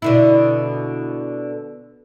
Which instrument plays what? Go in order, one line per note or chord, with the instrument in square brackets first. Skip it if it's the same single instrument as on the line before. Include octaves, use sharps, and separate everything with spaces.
[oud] B2 D3 E4